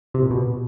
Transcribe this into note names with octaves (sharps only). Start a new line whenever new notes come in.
C3
A#2
B2